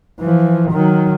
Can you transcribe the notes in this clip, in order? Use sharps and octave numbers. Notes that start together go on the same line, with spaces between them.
E3 F3
D#3 F#3